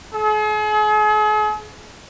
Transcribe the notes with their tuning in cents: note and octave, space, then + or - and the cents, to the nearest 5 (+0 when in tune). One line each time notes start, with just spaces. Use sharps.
G#4 +40